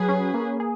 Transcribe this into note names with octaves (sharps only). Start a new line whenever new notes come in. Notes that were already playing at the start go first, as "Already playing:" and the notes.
Already playing: F#3 G#4 B4
C#4
A#3
G#4